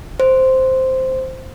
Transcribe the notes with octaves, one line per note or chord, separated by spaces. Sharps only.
C5